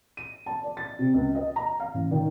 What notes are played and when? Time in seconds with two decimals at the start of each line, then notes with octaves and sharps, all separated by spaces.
0.17 D#7
0.46 A5
0.63 D5
0.77 A6
0.99 C3
1.14 C#2
1.35 D#5
1.56 A#5
1.80 F5
1.94 A1
2.11 D#3